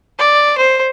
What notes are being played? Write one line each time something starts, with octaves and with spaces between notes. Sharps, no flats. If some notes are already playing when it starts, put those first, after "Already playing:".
D5
C5